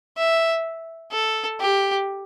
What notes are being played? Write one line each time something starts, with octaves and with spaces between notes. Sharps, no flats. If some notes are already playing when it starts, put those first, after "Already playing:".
E5
A4
G4